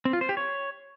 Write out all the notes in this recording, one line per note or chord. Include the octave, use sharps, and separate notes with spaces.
C4
F4
C5
G4
C#5